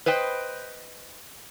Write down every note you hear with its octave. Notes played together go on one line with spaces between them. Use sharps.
B4 C5 D#5 G5